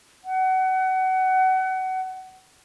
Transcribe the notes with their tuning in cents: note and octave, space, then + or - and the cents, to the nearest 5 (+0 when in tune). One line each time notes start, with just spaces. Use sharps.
F#5 +25